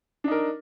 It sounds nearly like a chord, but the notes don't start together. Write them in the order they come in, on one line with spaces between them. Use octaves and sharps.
D4 D#4 A#4